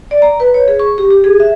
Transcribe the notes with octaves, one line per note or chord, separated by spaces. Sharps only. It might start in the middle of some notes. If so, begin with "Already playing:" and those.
D5
A#5
B4
C#5
G#4
C#6
G4
G4
G#4
E5